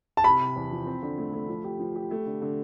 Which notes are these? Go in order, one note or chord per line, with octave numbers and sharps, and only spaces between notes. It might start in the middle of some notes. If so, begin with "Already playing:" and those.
A5
C3 B5
C3
E2
F3
C4
D3
A3
A3
F3
G4
F3
G4
A3
D3
D3